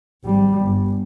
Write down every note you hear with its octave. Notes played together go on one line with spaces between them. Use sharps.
G#1 G3
G1